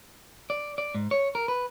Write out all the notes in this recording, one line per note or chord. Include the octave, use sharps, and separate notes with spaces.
D5
D5
G#2
C#5
A#4
B4